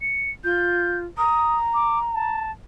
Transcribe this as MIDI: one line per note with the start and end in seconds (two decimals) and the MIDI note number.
0.01 0.30 97
0.44 1.05 65
0.44 0.98 91
1.18 2.39 82
1.18 1.57 87
1.74 1.99 86
2.14 2.51 81